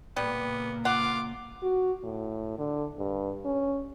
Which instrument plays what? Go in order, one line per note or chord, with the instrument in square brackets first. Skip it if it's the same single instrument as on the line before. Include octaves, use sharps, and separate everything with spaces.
[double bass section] A#2 C#3 A#3 [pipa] G3 [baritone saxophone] B3
[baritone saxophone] F4 [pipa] F#5 [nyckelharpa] D6
[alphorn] F#4
A2
D3
G2
C#4